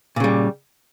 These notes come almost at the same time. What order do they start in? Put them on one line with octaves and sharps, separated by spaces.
A#2 C#3 G3